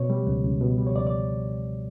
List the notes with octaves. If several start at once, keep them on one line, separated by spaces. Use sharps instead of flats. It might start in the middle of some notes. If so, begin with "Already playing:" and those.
Already playing: B2 C#5
G3
C#2
C#2
B2
G3
C#5
C#2 D5
D5